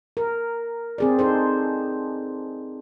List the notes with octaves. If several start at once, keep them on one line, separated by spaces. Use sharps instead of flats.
A#4
C4 G#4 D5
D#4 A4 C5